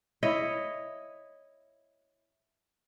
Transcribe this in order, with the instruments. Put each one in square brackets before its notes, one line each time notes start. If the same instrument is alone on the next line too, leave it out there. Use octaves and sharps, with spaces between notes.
[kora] E4 C#5 D#5